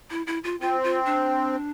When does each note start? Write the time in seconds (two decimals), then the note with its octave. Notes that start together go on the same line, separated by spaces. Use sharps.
0.10 E4
0.27 E4
0.44 F4
0.61 C4 F4
0.84 F4
1.05 D4